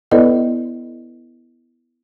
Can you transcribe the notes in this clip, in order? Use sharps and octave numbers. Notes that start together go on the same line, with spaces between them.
B3 E4 A4 B4 D5 D#5